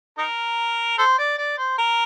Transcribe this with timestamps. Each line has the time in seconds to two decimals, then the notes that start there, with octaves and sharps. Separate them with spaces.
0.18 D#4 A#4
0.98 A4 C5
1.18 D5
1.38 D5
1.58 C5
1.78 A#4